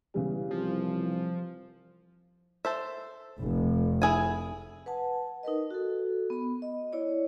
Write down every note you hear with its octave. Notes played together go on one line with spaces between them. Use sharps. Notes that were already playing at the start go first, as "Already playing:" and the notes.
E2 C#3 E3 G3
C2 F3
A4 C5 E5
F1
E4 G#4 G#5
B4 F#5 A5
D#4 A#4 B4 D#5
F#4 A4
B3 B5
D#5
E4 C#5 D5